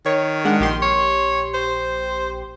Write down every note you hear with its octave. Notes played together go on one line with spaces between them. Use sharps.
D#3 C#5
G#3 D4 F#5
A#1 G4 C6
C#5
C5